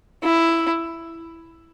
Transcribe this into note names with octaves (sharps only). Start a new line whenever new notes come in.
E4